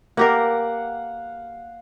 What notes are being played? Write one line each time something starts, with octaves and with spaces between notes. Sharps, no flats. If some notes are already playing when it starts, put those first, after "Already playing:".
A#3 G4 A#4 F5 F#5